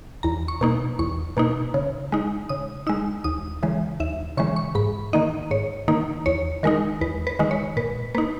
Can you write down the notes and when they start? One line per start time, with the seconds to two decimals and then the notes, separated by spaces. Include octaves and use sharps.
0.23 E2 A#5
0.48 C#6
0.61 B2 A#3 D#4
0.99 E2 C#6
1.37 B2 A#3 D#4
1.74 C#3
2.12 G#3 D#4
2.49 C#3 D#6
2.87 G#3 D#4 E6
3.24 D#2 D#6
3.63 C#3 E3 G#3
4.00 D#2 E5
4.37 C#3 E3 G#3 C#6
4.56 C#6
4.75 G#2 B5
5.13 D#3 A#3 D#4 D#5
5.51 G#2 C#5
5.88 D#3 A#3 D#4
6.26 E2 C#5
6.63 D#3 G#3 D#4 A#4
7.01 E2 B4
7.27 B4
7.39 D#3 G#3 D#4
7.51 C#5
7.77 A#2 B4
8.15 A#3 D#4 B4